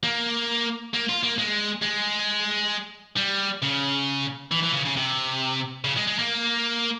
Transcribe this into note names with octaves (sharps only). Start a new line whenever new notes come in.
A#3
A#3
F4
A#3
G#3
G#3
G3
C#3
E3
E3
C#3
C#3
C3
C#3
G#3
G#3
A#3